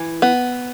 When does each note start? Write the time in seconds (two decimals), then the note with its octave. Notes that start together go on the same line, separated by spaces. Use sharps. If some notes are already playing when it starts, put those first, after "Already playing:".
Already playing: E3
0.22 B3